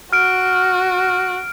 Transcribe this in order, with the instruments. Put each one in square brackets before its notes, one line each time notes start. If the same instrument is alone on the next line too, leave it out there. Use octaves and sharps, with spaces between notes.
[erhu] F#4 [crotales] F6 D7